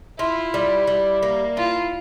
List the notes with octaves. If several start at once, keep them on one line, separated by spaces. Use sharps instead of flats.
E4 F4
G3
G3
A#3
E4 F4